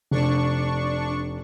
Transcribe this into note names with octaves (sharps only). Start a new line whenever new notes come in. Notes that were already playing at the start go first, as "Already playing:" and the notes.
F1 D4 C#6